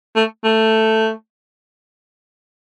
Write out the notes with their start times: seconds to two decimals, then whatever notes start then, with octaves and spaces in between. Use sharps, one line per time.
0.16 A3
0.44 A3